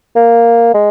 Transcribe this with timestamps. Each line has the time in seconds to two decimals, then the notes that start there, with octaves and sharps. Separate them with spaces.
0.16 A#3
0.74 G#3